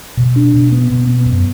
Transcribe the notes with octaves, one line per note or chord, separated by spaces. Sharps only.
B2
D4
B2
B3
B2
B3
F#2